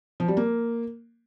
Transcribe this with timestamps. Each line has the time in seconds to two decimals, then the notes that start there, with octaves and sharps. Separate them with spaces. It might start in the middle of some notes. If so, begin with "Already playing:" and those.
0.20 F3
0.28 G3
0.37 A#3